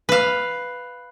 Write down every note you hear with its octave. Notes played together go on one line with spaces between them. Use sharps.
B4 F5